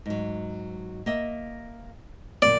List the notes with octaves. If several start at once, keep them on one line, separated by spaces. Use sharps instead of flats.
G#2 F#3
A#3 D#5 E5
F#2 A#2 D#3 D5